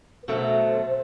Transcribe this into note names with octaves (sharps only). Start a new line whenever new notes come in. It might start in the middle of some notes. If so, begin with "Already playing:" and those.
B4
B2 F#3 A3 C5